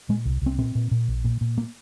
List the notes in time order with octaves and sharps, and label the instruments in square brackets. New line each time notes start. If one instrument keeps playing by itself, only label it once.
[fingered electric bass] A#2 G#3
C2
C2 C4
A#2 C4
A#2
A#2
A#1
A#2
A#2
A#3